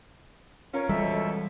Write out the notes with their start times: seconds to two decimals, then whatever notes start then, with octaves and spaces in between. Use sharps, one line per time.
0.74 C#4 F4 A#4 C#5
0.89 F2 B2 E3 G3 G#3 A4 E5